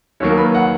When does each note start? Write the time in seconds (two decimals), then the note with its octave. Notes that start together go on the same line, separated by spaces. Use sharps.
0.20 D#2 D#3 F#3 A#3 C#5
0.37 B4
0.54 F#5